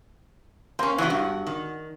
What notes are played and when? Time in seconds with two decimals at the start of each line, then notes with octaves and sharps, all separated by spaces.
0.79 A#3 C4 C#4 C6
0.98 C#3 E3 G#3 B3 F#4
1.10 G2
1.47 D#3